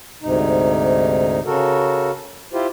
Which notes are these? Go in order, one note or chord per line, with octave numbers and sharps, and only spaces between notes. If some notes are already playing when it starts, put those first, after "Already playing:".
D2 G#2 C3 D#4
C#3 F#4 A4 A#4
E4 F4 G4 C5